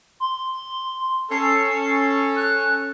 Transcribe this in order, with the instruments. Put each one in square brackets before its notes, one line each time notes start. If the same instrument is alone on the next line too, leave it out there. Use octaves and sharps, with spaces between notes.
[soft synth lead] C6
[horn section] C#4 A4 [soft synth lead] C7
[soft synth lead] F#6